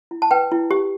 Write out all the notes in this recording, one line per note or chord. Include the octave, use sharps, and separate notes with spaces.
E4
A5
B4 G5
E4
G4